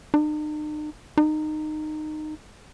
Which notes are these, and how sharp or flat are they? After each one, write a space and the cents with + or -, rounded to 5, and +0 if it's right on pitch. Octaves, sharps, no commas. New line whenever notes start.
D#4 -45
D#4 -20